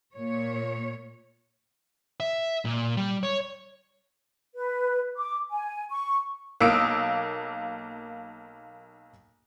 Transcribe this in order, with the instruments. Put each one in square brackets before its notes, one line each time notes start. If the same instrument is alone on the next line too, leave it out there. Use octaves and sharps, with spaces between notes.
[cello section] A#2 C#5
[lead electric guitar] E5
A#2
G3
C#5
[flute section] B4
D6
G#5
C#6
[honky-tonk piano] B1 A#3 D#6 E6 D7